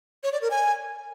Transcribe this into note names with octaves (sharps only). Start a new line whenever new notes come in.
C#5
D5
A#4
G#5